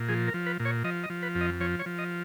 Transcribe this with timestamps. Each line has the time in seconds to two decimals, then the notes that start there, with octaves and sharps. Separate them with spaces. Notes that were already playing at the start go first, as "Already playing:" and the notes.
Already playing: A#2
0.08 F3 G#4
0.28 A#4
0.34 F3
0.46 B4
0.60 A#2
0.65 C#5
0.84 F3 D#5
1.03 D#5
1.10 F3
1.23 B4
1.35 F2
1.41 D#5
1.60 F3 C#5
1.79 C#5
1.86 F3
1.98 D#5